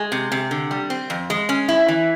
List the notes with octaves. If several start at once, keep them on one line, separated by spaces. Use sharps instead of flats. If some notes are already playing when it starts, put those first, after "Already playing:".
Already playing: G#3
C3
C3
D3
G3
C4
F2
G#3
C#4
E4
E3